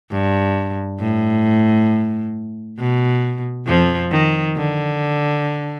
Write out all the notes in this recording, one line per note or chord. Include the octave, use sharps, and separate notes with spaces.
G2
A2
B2
F2 F3
D#3
D3